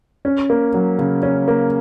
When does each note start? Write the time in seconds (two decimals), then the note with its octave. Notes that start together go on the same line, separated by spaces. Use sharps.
0.25 C#4
0.50 A#3
0.74 F#3
0.98 C#3
1.23 C#4
1.48 A#3